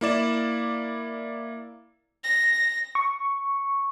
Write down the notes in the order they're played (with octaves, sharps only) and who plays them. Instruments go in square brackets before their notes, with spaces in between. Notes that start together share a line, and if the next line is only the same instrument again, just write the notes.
[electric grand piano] A#3 E4 D5 E7
[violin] A#6
[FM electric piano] C#6